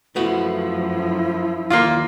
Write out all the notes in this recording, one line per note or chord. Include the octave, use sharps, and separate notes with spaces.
F#2 F3 A3 B3 E4 F#4
D#2 A#3 F4 D5 C6